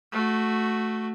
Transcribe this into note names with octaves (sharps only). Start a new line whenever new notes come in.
A3 F#4